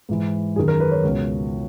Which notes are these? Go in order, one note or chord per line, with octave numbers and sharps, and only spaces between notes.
G#2 E3
F#2 D#3 G#4
A#4
B4
C#5
C#2 B2